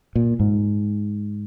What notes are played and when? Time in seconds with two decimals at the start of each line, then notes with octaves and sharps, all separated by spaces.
0.16 A#2
0.40 G#2